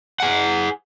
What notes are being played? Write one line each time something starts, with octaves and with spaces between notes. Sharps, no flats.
G#4 F#5